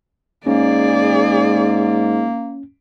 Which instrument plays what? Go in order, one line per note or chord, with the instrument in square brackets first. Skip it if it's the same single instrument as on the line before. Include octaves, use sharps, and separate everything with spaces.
[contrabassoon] G#2 [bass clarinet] A#3 [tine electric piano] C#4 [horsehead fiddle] G#4 D5